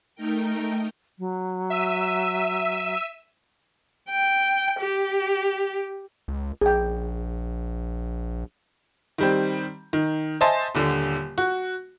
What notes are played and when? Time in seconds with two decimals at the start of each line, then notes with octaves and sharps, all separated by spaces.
0.15 A3 D#4 A#4 G5
1.19 F#3
1.70 E5 E6 D#7
4.09 G5
4.80 G4
6.28 C#2
6.61 A#1 G#4 G5
9.18 D#3 G3 C4
9.93 D#3
10.41 C5 D#5 E5 G#5 A5 C6
10.75 D#1 D3
11.38 F#4